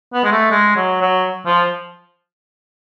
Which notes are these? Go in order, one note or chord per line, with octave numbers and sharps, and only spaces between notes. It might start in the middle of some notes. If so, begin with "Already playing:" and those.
B3
G#3
A3
G#3
F#3
F#3
F3